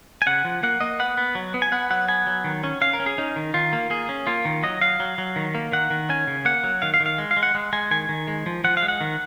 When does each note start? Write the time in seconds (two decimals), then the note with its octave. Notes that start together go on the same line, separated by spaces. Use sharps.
0.22 G#5
0.26 C#3 F#5
0.45 F3
0.63 A#3 F#5
0.80 A#3 D#5
1.00 B3 F#5
1.17 B3
1.35 F#3
1.54 B3
1.62 G#5
1.72 B3 F#5
1.90 F#3 F#5
2.08 B3 G#5
2.27 F#3
2.44 D#3
2.64 C#4
2.81 C#4 F5
2.93 A#4
3.00 C#4
3.06 G#4
3.18 C#4 D#4
3.36 D#3
3.54 D#3 F4
3.73 A#3
3.90 A#3 G#4
4.09 C#4
4.27 A#3 F4
4.45 D#3
4.63 F#3 D#5
4.81 F#3 F5
5.00 F#3
5.18 F#3
5.36 D#3
5.55 A#3
5.72 D#3 F#5
5.90 D#3
6.09 C#4 G#5
6.27 C#3
6.45 A#3 F#5
6.64 F#3
6.82 D#3 F5
6.94 F5
7.00 D#3
7.06 F5
7.18 G#3
7.31 F5
7.37 G#3
7.43 F#5
7.55 G#3
7.73 G#3 G#5
7.91 D#3 G#5
8.09 D#3
8.28 G#3
8.46 F3
8.64 F3 F#5
8.77 F5
8.83 G#3
8.88 F#5
9.01 D#3